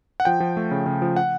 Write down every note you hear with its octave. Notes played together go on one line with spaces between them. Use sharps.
F#5
F3 G5
F3
A3
C#3
C#3
F3
F#5